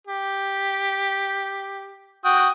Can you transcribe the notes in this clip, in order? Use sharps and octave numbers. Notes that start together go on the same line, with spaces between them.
G4
F#4 G5 D#6